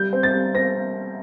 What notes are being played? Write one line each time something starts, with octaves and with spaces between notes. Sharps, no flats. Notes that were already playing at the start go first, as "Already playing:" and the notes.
Already playing: G3 G6
C4
A6
G3
C4 A#6